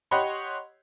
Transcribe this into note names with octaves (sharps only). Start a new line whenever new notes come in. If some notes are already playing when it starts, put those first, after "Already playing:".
G4 C#5 D#5 F#5 B5 C6